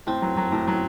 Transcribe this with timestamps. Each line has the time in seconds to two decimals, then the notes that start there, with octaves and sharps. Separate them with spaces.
0.07 A2 C4
0.22 F#3
0.37 F#3
0.52 A2
0.67 F#3